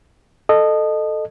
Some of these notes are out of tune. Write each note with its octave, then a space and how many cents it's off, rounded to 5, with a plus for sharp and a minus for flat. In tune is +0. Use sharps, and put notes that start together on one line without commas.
A4 +0 D#5 -20